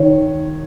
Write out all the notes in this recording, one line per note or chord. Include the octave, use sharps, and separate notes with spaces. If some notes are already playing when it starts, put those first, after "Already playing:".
Already playing: D#3 C#5